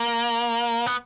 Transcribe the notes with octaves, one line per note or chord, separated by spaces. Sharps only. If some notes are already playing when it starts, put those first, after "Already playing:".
Already playing: A#3
B3